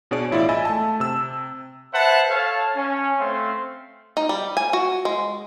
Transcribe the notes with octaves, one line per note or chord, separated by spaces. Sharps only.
B2 D4 G#4 C#5 D5 D7
A1 E4 F4 D5
D#5 E5 G#5 B5 E6 A6
A3 A5
C3 E6
B4 C5 E5 F#5 A5
A4 C#5 F5 A5
C#4
A3 C4 F5 C6
D#4
G3
G#5
F#4
G#3